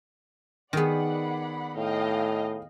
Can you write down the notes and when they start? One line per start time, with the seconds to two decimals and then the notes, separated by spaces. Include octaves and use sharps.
0.73 D#3 B3 D#4 G#4 D5 F#5 B5
1.77 A2 D#5 F5 G5